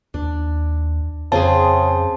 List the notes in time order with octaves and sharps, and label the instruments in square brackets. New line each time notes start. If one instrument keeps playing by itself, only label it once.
[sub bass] D#2 [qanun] D4
[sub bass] F2 [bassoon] C#3 [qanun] C4 G#4 [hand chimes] A5